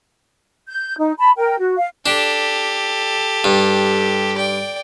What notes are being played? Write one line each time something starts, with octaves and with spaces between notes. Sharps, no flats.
G6
D#4
A5 B5
A#4 G5
F#4
F5
D4 G4 A4
G2
D5 G5